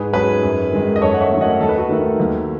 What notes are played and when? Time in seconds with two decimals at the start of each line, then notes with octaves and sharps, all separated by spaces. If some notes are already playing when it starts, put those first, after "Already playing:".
Already playing: G#2 G#4 B4
0.13 F#3 C#4 G#4 B4
0.43 F#2
0.72 D#3 G#3
0.96 D#5
1.01 F#2 A4 C#5
1.14 F#5
1.21 C#5 E5
1.31 D#3 F#3 A3
1.41 D#5 F#5
1.60 D#2 A4
1.69 B4
1.78 F#4 A4
1.89 D#3 A3 D#4
2.20 D#2